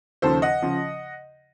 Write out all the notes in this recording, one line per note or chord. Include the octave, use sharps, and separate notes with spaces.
D#2 C#3 F3 A4 C5
D#5 F#5
C#3 F3